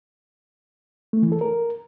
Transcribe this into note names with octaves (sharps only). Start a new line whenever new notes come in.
A3
E3
A4
A#4